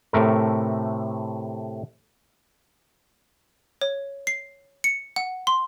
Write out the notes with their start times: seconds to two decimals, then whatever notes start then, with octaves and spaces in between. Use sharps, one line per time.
0.13 A2 C3 A3 A#4
3.81 C#5
4.27 C7
4.84 C#7
5.16 F#5
5.47 C6